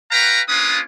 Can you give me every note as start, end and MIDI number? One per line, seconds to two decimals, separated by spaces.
0.11 0.40 66
0.11 0.40 71
0.11 0.40 77
0.11 0.40 79
0.11 0.40 82
0.49 0.80 58
0.49 0.80 61
0.49 0.80 62
0.49 0.80 65
0.49 0.80 71
0.49 0.80 87